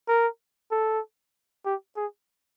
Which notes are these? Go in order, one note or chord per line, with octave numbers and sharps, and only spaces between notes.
A#4
A4
G4
G#4